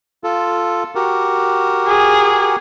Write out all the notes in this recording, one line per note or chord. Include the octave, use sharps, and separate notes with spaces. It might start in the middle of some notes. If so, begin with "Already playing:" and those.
F4 A4
F#4 G4 A#4
G#4